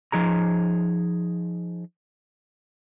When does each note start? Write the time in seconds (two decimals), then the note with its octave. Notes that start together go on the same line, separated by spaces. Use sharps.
0.12 F3 D#4 G#4 A#5